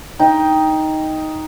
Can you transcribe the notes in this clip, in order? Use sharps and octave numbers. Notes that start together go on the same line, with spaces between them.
D#4 G5